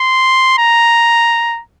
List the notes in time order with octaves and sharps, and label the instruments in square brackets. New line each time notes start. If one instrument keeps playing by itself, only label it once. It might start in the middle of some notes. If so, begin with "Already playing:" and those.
Already playing: [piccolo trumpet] C6
A#5